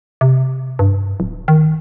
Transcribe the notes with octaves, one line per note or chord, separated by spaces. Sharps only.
C3
G2
D1
D#3